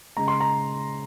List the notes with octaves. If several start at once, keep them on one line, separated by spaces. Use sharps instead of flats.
C#3 G#3 A#5
C6
A#5